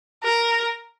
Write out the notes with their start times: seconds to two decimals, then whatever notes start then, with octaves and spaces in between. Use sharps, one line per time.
0.24 A#4